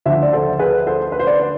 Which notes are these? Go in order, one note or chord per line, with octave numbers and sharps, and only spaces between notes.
D2 D3 F3 C5 E5
D5
A4 C5
G#4 B4
A4 C5
B4
C5
B4 D5